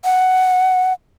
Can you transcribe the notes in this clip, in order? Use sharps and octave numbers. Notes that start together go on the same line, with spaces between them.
F#5